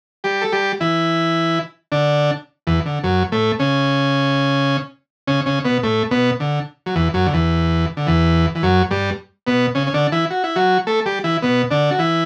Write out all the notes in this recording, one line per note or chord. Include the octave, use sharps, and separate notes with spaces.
G3 G4
A4
G3 G4
E3 E4
D3 D4
E2 E3
D3
F#2 F#3
A2 A3
C#3 C#4
C#3 C#4
C#3 C#4
B2 B3
A2 A3
B2 B3
D3
F#3
E2 E3
F#2 F#3
D3
E2 E3
D3
E2 E3
E3
F#2 F#3
G2 G3
B2 B3
C#3 C#4
C#4
D3 D4
E3 E4
F#4
E4
F#3 F#4
A3 A4
G3 G4
E3 E4
B2 B3
D3 D4
F#4
E3 E4